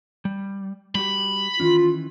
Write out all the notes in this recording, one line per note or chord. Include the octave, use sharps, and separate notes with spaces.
G3
G3 F#4 G4 B5
D#3 E3 C#4 F4